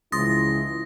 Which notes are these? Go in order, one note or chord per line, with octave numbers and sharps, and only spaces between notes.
C#2 E3 F3 E4 C6 D#6 A6 A#6